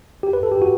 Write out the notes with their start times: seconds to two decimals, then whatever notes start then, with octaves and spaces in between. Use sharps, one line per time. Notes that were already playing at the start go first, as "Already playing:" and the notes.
0.23 G4
0.33 B4
0.43 A4
0.52 G4
0.62 F#4